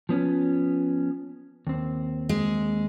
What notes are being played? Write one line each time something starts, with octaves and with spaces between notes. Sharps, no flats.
F3 B3 C#4
D#2 C4
G#3